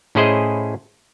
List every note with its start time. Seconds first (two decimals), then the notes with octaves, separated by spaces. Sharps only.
0.15 A2 C#4 E4 G#4 C5 D#5